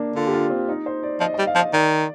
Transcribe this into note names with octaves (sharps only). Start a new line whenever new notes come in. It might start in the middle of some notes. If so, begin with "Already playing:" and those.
Already playing: A#3 D4
D3 F4
G4
F4
C4
D#4
C5
D5
F3 D#5
G3 D#5
F5
F3
D#5
D#3 D5